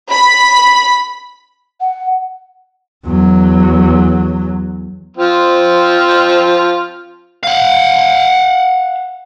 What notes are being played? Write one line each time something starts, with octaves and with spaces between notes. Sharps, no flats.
B5
F#5
E2 F#3
F3 C4 F4
F5 F#5